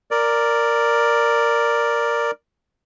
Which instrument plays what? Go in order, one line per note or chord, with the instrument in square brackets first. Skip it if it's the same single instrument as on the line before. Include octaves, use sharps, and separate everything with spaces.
[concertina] A#4 D5